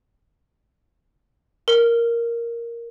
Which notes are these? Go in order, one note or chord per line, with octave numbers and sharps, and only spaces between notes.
A#4